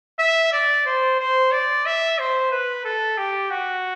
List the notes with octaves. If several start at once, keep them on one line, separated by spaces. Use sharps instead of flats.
E5
D5
C5
C5
D5
E5
C5
B4
A4
G4
F#4